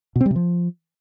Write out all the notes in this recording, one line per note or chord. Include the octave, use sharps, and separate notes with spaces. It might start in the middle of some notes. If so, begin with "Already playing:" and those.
B2
C4
G3
C3
F3